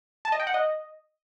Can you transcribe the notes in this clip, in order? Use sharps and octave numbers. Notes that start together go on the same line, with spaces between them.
A5
D#5
G5
F#5
D#5